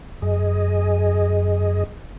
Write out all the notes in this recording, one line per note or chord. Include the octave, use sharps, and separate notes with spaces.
F#2 G#4 D#5